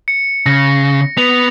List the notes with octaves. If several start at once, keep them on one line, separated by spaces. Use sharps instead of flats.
C#7
C#3 A#6
B3 F7